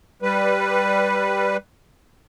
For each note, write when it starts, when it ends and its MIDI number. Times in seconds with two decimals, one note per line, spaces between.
0.22 1.57 55
0.22 1.57 71